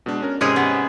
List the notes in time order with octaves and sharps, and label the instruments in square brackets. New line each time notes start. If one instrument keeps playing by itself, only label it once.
[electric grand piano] B2 G#3 D4
C#4 A#4
[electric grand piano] G#2 C3 [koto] G#3 C#4 G#4
[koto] B3